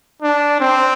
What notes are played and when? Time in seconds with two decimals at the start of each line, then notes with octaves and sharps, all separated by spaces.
0.22 D4
0.60 C4